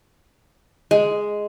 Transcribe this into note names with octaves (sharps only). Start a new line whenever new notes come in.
G#3